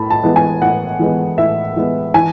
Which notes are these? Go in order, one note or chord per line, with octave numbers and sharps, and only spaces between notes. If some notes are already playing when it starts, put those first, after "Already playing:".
Already playing: A2 A5 B5
A5
E3 G#3 B3
G#5
A2 F#5
E3 G#3 B3
A2 E5
E3 G#3 B3
E3 G#5